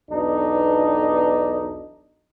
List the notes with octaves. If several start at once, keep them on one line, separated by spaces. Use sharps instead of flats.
B1 E2 D4 D#4